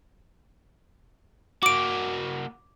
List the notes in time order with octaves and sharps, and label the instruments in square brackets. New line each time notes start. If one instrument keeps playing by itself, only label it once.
[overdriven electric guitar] A#3 F#4 [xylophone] D6 D7